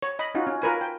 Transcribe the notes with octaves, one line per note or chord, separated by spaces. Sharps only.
C#5
D#5 B5
C#4 D#4 F4 F#4
C#4
F4 A#4 B4 G#5
G5